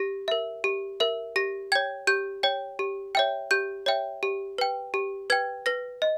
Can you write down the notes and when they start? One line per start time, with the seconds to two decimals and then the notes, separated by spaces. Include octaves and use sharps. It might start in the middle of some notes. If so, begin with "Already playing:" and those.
Already playing: G4 A#6
0.28 A#4 E5
0.64 G4
1.00 A#4 E5
1.36 G4 A#6
1.72 C#5 G5 G#6
2.07 G4 G6
2.43 C#5 G5
2.79 G4
3.15 C#5 E5 G5
3.51 G4 G6
3.86 C#5 E5 G5
4.23 G4
4.58 B4 G5
4.94 G4
5.30 B4 G5 G#6
5.66 B4 A#6
6.02 D#5